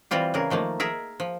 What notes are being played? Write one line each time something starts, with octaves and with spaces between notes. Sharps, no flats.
E3 G3 C4 F4 G4
C#3 E3 G#4 A#4
D#3 F3 A3 A#3
G#4 A#4 E5
F3